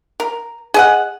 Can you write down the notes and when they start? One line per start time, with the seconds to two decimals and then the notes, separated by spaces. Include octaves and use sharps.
0.20 A#4
0.74 G#4 D#5 F#5